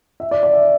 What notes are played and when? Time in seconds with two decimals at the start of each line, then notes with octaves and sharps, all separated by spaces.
0.20 E5
0.31 D5
0.43 D5
0.53 E5